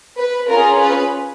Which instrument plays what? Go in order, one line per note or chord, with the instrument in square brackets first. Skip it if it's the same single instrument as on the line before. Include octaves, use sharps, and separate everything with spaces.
[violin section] B4
C#4 F4 G#4 A#4
B4